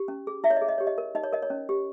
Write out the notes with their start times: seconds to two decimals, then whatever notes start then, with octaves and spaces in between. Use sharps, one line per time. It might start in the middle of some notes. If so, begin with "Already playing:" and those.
Already playing: G4
0.08 C#4
0.27 G#4
0.44 E4 E5
0.50 C#5
0.56 D#5
0.61 G#4
0.69 D#5
0.78 G4 C#5
0.87 D#5
0.98 A#4
1.15 D#4 D#5
1.24 C#5
1.33 A#4 D#5
1.42 C#5
1.50 C#4
1.69 G4